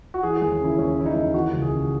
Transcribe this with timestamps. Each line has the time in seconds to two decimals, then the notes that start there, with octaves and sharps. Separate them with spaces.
0.14 F#4
0.23 E3 G#4
0.37 D#2 G#4
0.60 C#3 E4
0.78 D#2 C#4
0.97 E3 E4
1.06 D#4
1.15 D#2
1.24 E4
1.33 E3 F#4
1.53 C#2
1.62 G#4
1.71 C#3